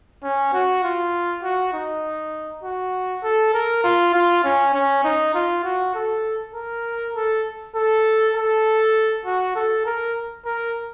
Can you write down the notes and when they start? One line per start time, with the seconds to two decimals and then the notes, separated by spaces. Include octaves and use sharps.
0.23 C#4
0.53 F#4
0.84 F4
1.43 F#4
1.74 D#4
2.64 F#4
3.24 A4
3.54 A#4
3.84 F4
4.15 F4
4.44 C#4
4.74 C#4
5.04 D#4
5.35 F4
5.64 F#4
5.95 A4
6.55 A#4
7.15 A4
7.76 A4
8.35 A4
9.26 F#4
9.56 A4
9.86 A#4
10.46 A#4